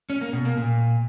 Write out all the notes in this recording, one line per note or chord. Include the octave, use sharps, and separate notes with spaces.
C#4
A#3
B2
A#3
A#2